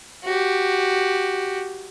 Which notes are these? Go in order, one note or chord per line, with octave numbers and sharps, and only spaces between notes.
F#4 G4